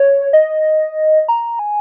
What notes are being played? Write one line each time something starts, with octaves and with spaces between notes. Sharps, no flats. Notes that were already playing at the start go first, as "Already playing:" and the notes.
Already playing: C#5
D#5
A#5
G#5